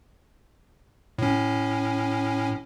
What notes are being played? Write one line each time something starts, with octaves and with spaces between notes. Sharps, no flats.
A2 C#4